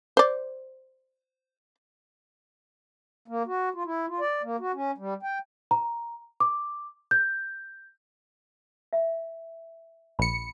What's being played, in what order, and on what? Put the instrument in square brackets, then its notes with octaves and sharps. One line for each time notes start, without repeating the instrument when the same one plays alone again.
[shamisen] C5 D5
[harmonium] A#3
F#4
F4
E4
F4
D5
A#3
F#4
C#4
G3
G5
[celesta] A#5
D6
G6
[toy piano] E5
[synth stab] A#1 C#7 [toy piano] B5